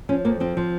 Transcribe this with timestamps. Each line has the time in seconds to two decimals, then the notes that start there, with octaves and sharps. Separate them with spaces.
0.09 F3 C#4
0.25 F2 A#3
0.40 F3 C4
0.57 F3